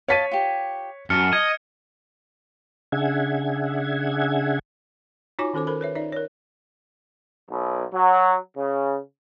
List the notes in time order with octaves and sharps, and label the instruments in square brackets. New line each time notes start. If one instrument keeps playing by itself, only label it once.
[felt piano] C#5 B6 D#7 [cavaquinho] D#5 F5 A5
[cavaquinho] F4 G4
[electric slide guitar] F#2 [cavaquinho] A5 D6 [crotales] F6 C#7
[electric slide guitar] D#5 [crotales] G#6
[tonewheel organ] C#3 D4 G#4 E5 F#5 G#6
[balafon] D#4 F4 F#4 C#5 G#5 D6
D#3 C#4 A4 C5 D6
A4 A#4 C5 B5
B4 C#5 E5
D#4 D5 E5
A#4 C#5
[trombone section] B1
F#3
C#3